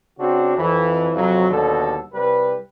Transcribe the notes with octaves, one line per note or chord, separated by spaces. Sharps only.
C#3 C4 D4 F#4
F2 E3
F2 C3 F#3
D#2 B2 D3 G3 A4
C2 G3 B4